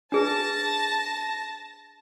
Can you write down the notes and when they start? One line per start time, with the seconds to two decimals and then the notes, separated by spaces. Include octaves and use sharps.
0.12 D4 G#4 B4 A5 A#6